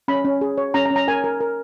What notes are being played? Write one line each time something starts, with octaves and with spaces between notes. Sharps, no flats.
C#4 B5
C#4
G#4
C#5
C#4 A#5
A#5
C#4
A#5
A#4 G#5
A#4
A#4